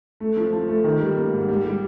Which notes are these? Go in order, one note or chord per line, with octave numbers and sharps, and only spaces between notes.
A3
F3
F3
A3
D#3
G3
A#3
G#2
G3
G3